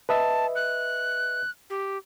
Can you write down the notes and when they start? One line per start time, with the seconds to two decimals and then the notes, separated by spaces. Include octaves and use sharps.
0.09 B4 D#5 E5 A5
0.55 F#6
1.70 G4